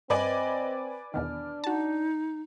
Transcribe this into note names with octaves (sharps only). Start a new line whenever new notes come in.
G2 C4 B4 D5 D#5 G#5
E2 B2 D#3 D4 F6
D#4 F#4 A5